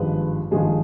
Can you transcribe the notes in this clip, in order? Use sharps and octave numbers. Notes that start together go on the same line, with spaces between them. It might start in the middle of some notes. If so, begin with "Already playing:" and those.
Already playing: G#1 G2 F3 G#3 B4
G#1 G2 F3 G#3 G#4